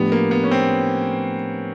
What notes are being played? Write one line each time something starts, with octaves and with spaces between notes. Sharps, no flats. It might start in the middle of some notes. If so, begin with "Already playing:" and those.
Already playing: A2 F3 A3 B3 D4 G4
A#3
B3
C#4
C4